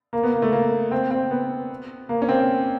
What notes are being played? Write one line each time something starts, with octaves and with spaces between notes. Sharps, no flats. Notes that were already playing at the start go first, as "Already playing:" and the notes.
A#3
B3
A#3
A3
A#3
C4
C4
B3
A#3
C#4
C4